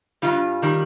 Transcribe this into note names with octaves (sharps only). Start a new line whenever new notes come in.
G2 D#3 G3 F4
D#3 G3